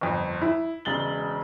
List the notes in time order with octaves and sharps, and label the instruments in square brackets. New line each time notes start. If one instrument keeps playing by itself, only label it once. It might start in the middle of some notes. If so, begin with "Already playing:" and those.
[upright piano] G1 F2
E4
E1 C#3 G#3 A6 F#7 G7